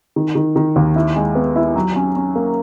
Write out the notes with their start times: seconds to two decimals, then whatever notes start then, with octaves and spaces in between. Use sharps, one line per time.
0.16 D#3
0.35 D#3
0.56 D#3
0.76 D#2
0.96 E4
1.16 G#3
1.35 B3
1.56 E4
1.76 F#3
1.96 C#4
2.16 C#4
2.36 A#3